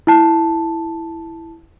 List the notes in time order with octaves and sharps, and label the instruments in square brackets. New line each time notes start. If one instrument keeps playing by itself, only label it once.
[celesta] E4 A5